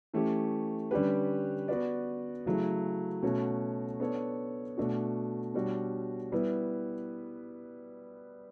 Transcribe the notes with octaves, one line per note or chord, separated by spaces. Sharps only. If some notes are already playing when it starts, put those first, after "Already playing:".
E3 A3 C#4 G4
D3 G3 C#4 G4 B4
B3 F#4 B4 D5
C#3 F#3 A3 E4
B2 A3 C#4 F#4 C#5
B3 D4 A4 C#5
B2 A3 D4 F#4
B2 G3 D4 F#4 C#5
G3 B3 E4 B4